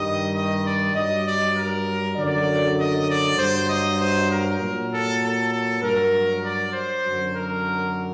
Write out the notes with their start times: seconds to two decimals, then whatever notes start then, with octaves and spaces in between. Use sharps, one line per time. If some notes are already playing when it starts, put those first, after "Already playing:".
Already playing: G2 D#3 G3 D#5
0.33 D#5
0.64 D5
0.95 G2 F#3 D#5
1.24 D5
1.55 A#4
2.16 F#2 D3 F#3 D5
2.78 D#5
3.07 D5
3.38 G2 F#3 C5
3.68 D#5
3.99 C5
4.29 A#4
4.60 A#2 F#3
4.91 A4
5.21 A4
5.51 A4
5.81 G2 F#3 A#4
6.43 D5
6.72 C5
7.04 F#2 D3 F#3
7.34 A#4